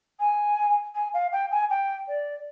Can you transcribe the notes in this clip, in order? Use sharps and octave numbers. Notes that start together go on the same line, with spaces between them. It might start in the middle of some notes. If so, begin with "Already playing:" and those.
G#5
G#5
F5
G5
G#5
G5
D5